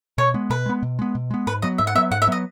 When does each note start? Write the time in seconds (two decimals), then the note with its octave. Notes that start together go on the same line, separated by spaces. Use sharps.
0.18 B2 C#5
0.34 G#3 B3
0.50 B2 B4
0.66 G#3 B3
0.83 B2
0.99 G#3 B3
1.15 B2
1.31 G#3 B3
1.47 G#2 B4
1.62 F#3 B3 D#5
1.78 G#2 E5
1.87 F#5
1.95 F#3 B3 E5
2.11 G#2 F#5
2.22 E5
2.27 F#3 B3 D#5